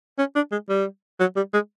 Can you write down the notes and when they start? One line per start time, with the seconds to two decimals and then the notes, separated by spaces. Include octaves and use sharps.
0.19 C#4
0.36 D4
0.51 G#3
0.69 G3
1.20 F#3
1.36 G3
1.53 G#3